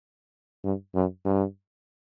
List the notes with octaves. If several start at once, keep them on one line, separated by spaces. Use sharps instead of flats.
G2
F#2
G2